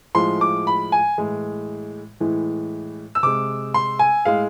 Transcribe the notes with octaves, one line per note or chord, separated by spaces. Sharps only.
A2 F3 G#3 C6
D6
B5
G#5
A2 E3 G#3
A2 E3 G#3
E6
C3 G#3 D6
C6
G#5
A2 G#3 F5